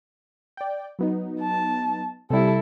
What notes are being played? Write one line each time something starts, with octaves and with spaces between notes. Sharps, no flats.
D5 G5
F#3 B3 D#4
A5
C3 G3 E4 A4